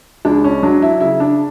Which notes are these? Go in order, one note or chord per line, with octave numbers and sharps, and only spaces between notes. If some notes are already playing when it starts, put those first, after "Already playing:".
C#2 D4
C#4
F#3 D4
E4
C#3 E4
D4